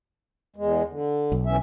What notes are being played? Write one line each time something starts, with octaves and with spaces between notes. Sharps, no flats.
E2 G#3
D3
B1
E3 C#4 E5